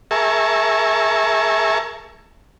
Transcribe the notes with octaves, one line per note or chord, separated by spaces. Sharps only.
G#4 A#4 E5 A5 C#6